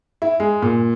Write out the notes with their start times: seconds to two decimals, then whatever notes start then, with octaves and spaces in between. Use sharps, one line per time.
0.22 E4
0.40 G#3
0.62 A#2